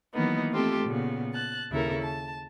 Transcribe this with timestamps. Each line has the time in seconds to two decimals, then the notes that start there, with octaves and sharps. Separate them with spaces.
0.13 D#3 E3 F#3 A#3 B3 D#4
0.51 A3 C4 F4 G4 A4
0.84 A#2 C#3 B3
1.32 A5 F#6
1.71 D#2 C#3 E4 A4 A#4
2.01 A5